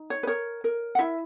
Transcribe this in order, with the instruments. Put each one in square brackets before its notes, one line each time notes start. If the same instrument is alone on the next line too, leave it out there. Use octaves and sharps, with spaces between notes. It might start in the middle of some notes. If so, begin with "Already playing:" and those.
Already playing: [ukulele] D#4
C#5
B4
A#4 C#5
A#4
F#5
E4 E5